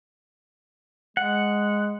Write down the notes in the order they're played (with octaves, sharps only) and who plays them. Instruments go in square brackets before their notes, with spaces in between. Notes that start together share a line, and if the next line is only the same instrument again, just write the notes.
[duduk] G#3 [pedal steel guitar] F#5